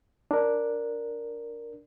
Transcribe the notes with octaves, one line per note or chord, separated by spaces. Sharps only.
D4 A#4